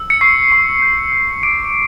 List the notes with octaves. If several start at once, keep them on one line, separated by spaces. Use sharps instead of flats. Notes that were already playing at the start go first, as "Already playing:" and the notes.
Already playing: E6
C#7
C#6 C7
C#6
G6
E6
D6 D7